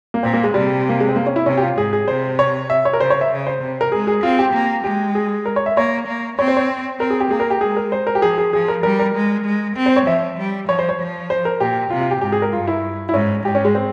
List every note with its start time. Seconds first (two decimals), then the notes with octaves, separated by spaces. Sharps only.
0.14 A#3
0.23 A#2 C4
0.33 A#3
0.44 G#3
0.54 C3 G3
0.89 A#3
1.00 G#3
1.09 C4
1.16 A#3
1.26 C#4
1.36 E4
1.46 C3 C#4
1.58 G4
1.62 F4
1.77 G#2 G#4
1.93 G#4
2.08 C3 C5
2.39 C#5
2.70 E5
2.85 C#5
2.93 A#4
3.00 C#3 C5
3.10 C#5
3.21 E5
3.31 C#3
3.47 C5
3.62 C3
3.81 A#4
3.92 G#3 G#4
4.07 G#4
4.23 C4 F4
4.39 G4
4.54 A#3
4.84 G#3 G4
5.15 G#4
5.46 A#4
5.56 C#5
5.66 E5
5.77 A#3 C#5
6.07 A#3
6.38 C4 C#5
6.48 C5
6.57 C#5
6.99 C4 A#4
7.10 G#4
7.20 G4
7.30 A#3 G#4
7.40 A#4
7.50 G4
7.61 G#3 G#4
7.77 A#4
7.92 C5
8.07 A#4
8.15 G4
8.22 F3 G#4
8.38 G#4
8.53 F3 G#4
8.68 A#4
8.83 G3 A#4
9.00 A#4
9.15 G#3
9.45 G#3
9.76 C4
9.86 C5
9.96 C#5
10.07 F3 E5
10.38 G3
10.68 F3 C#5
10.79 C5
10.89 C#5
10.99 F3
11.30 C5
11.45 A#4
11.60 A#2 G4
11.90 C3 F4
12.01 F4
12.11 G4
12.21 G#2 G4
12.32 G#4
12.42 A#4
12.53 G2 F4
12.67 E4
13.09 E4
13.14 G#2 C#4
13.44 G#2 G4
13.55 C#4
13.65 G#3
13.75 C4